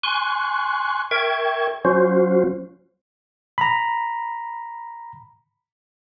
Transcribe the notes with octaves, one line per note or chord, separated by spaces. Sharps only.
G#5 C6 C#6 F#6
A#4 E5 G5 C#6 G#6
F#3 C#4 F4 F#4 C5
A#5 B5